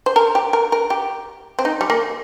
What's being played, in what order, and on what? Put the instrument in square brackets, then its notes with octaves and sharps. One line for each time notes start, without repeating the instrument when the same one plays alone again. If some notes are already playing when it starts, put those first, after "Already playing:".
[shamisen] C5
A#4
G4
A#4
A#4
G4
C4
D#4
G3
A#3